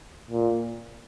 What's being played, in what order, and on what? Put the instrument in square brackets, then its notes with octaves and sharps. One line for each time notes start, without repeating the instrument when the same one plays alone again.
[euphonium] A#2